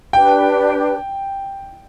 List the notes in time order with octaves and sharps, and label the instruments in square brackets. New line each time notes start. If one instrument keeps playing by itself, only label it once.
[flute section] D4 G4 B4 [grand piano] G5